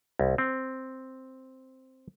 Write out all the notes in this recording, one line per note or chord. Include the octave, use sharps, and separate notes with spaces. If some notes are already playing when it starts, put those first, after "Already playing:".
C2
C4